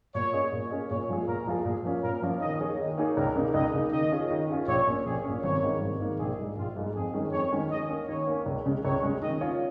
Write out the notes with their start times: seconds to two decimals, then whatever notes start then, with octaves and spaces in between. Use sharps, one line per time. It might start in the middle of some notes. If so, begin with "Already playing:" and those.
0.15 A#2 C#5
0.33 A#3 C#4 G#4 D#5
0.52 A#2
0.71 A#3 C#4 G#4 D#5
0.90 A#2 C#5
1.10 F3 G#3 F4 G#4
1.28 A#2 A#4
1.47 F3 G#3 F4 G#4
1.65 A#2 G#4
1.84 F3 A#3 C#4 F4
2.03 A#2 A#4
2.22 F3 A#3 C#4 F4
2.41 D#3 D#5
2.60 A#3 D#4 G#4 C#5
2.79 D#3 D#5
2.97 A#3 D#4 G#4 C#5
3.17 C#2 A#4
3.36 C#3 A#3 D#4
3.54 C#2 D#5
3.74 C#3 A#3 D#4
3.92 D#3 D#5
4.12 C#4 F4 G#4
4.30 D#3
4.49 C#4 F4 G#4
4.68 A#1 C#5
4.87 A#2 A#3 C#4
5.05 A#1 G#4
5.25 A#2 A#3 C#4
5.43 G#1 C#5
5.62 G#2 D#3 A#3
5.81 G#1
6.00 G#2 D#3 A#3
6.20 A#1 G#4
6.39 G#2 G#3
6.57 A#1 F4
6.76 G#2 G#3
6.95 F2 G#4
7.14 D#3 G#3 C#4 G#4
7.32 F2 C#5
7.52 D#3 G#3 C#4 G#4
7.71 D#3 D#5
7.90 A#3 C#4
8.08 D#3 C#5
8.27 A#3 C#4
8.46 C#2
8.66 C#3 G#3
8.84 C#2 C#5
9.03 C#3 G#3
9.22 D#3 D#5
9.41 C#4 F4 C#5